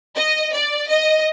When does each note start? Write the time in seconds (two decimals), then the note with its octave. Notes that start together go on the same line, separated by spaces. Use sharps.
0.16 D#5
0.54 D5
0.89 D#5